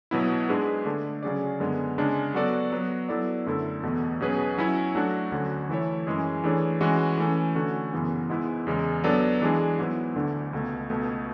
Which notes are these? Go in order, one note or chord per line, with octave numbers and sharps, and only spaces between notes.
B2 F#3 B3 E4
G#2 G#3 D4 G#4 B4
D3 A3 D4
C#3 F#3 C#4 G#4 D5
F#2 D3 G#3 B3
C#3 G#3 D4
F#3 B3 F#4 A4 D5
F#3 B3 F#4
F#3 B3 E4 A4 D5
F#2 D3 A3 E4 A4
E2 B2 A3
B2 F#3 C#4 G#4 B4
F#3 C#4 E4
F#3 A3 D4 F#4
D2 D3 F#3 C#4 F#4
E3 A3 E4 A4 C#5
F#2 E3 G#3 C#4 G#4
E3 A3 D4 G#4 C#5
E3 G#3 C#4 F#4
E3 A3 C#4
D3 A3 C#4 F#4
F#2 C#3 E3 B3
G#2 G#3 B3 E4
E2 C#3 G#3
F#3 B3 D4 A4 D5
E3 G#3 D4 G#4
G#2 F#3 B3 E4
D2 D3 A3 D4
C#2 B2 A3
C#2 B2 A3